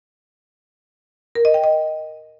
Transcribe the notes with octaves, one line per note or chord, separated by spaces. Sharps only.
A#4
D#5
G5
D#5